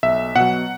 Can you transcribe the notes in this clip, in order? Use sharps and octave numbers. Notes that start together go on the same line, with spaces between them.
B1 E5
B2 F#3 F#5